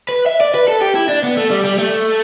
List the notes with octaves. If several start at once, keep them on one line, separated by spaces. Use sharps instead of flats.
B4
E5
D5
B4
A4
G4
E4
D4
B3
A3
G3
G3
A3